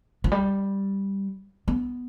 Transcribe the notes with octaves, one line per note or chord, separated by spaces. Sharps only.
F3
G3
B3